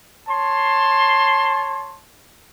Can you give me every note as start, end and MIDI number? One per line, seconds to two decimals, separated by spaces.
0.28 2.00 73
0.28 2.00 81
0.28 2.00 84